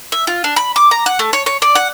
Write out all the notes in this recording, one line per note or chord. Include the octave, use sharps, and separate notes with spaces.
E5
F4
D4
B5
D6
A#5
F#5
A3
C#5
C#5
D5
F#5